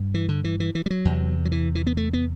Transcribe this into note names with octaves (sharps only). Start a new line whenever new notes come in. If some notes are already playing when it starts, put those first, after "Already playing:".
Already playing: G2
E3
D3
E3
E3
E3
G3
F#3
E2 C3
F#3
E3
E3
B3
A3
B3